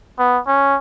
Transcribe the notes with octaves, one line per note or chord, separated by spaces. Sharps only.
B3
C#4